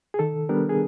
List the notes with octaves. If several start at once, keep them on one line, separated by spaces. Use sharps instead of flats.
G#4
D#3 A4
G3 B3 D4 A#4
G#4